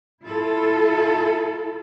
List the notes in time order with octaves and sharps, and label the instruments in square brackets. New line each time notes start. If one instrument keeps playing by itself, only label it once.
[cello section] E4 F4 A4